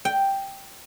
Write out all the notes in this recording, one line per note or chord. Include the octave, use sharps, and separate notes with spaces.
G5